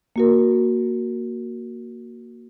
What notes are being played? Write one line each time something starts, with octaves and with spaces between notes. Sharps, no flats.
A#3 F#4 A#4